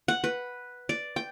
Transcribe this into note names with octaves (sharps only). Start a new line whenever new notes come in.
F#5
B4
D5
G5